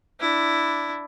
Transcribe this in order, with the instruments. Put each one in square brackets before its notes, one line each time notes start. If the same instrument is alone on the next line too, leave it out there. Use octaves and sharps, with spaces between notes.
[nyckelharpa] D4 E4